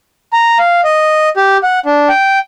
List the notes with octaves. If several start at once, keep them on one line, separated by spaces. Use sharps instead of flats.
A#5
F5
D#5
G4
F#5
D4
G5